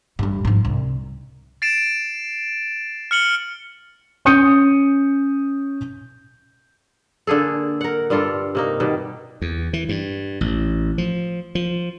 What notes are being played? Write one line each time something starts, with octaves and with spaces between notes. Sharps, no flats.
G2 G3
G#2 F3
C2
A6 C7 D7 E7
F6 C#7 F#7 G7
C#4 D#6 G6 C#7 D#7
D3 A#3 G#4 A4
A#4 F#5
G2 G3 F4 A4
C3 A#3 D#4
B2 D#3 G3
E2
E3
G2
A1
F3
F3